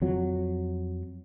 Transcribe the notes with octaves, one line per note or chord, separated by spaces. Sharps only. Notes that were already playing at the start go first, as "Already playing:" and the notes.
F2 F#3